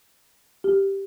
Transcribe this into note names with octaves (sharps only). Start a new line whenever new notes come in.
G4